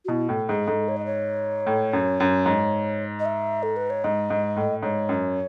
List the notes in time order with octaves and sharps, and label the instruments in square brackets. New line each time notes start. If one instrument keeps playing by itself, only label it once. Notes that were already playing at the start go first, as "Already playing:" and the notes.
[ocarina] F#4
[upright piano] B2 [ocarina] E4
[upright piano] A2
[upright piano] G#2 [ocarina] G#4
[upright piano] G#2 [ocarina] A4
[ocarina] C#5
D#5
C#5
[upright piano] A2
F#2
F#2
G#2
[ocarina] D#5
E5
A4
B4
C#5
[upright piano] G#2 [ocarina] D#5
[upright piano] G#2
A2
[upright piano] G#2 [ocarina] C#5
[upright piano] F#2